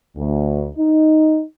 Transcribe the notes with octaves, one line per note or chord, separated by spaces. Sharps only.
D2
D#4